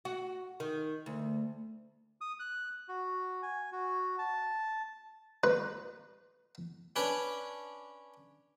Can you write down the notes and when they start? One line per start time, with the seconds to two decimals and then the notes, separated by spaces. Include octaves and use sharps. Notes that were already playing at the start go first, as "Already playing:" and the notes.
0.05 F#4
0.60 D#3
1.06 D2
2.21 D#6
2.39 F#6
2.88 F#4
3.43 G#5
3.72 F#4
4.18 A5
5.44 B4
6.96 C#4 D4 B4 C#5